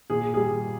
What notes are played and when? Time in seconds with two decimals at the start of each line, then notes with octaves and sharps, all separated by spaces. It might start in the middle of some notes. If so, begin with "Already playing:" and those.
0.10 A#2 G#4
0.34 G3 G#4